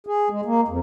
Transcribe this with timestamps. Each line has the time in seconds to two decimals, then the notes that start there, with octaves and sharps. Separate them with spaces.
0.07 G#4
0.30 G#3
0.45 A#3
0.68 F2